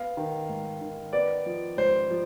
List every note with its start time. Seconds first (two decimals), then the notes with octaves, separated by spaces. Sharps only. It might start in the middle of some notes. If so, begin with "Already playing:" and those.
Already playing: B3 F5
0.17 D#3
0.49 G#2
0.81 D#3
1.13 B3 D5
1.46 F3
1.77 G#2 C5
2.10 F3